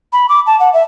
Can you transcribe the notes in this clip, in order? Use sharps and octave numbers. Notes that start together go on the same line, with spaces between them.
B5
D6
A5
F#5
E5